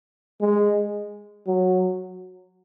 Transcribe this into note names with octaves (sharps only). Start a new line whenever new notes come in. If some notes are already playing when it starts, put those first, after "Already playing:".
G#3
F#3